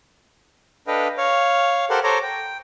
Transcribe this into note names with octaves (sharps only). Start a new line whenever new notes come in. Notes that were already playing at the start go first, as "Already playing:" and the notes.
D4 A4 B4 D#5 F5 G5
C#5 F5
G4 A4 A#4 C5 F#5
A4 C5 C#5 A#5 D6
G5